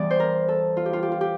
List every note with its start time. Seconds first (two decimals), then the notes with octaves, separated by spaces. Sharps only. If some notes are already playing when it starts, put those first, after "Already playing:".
Already playing: E2 E3 G3 D5
0.11 C5
0.20 A#4
0.48 A4
0.77 F4
0.86 G4
0.93 F4
1.03 G4
1.12 F4
1.21 G4